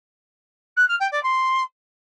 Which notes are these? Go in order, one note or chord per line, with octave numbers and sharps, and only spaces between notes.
F#6
F6
G5
D5
C6